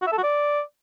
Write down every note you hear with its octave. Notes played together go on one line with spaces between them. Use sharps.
F#4
E5
A4
F#4
D5